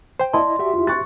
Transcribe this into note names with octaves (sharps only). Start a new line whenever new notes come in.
C5 G5
E4 D5 D#5 A5 C6
F#4 G4 E5
E4 F4
C#6 F#6 A6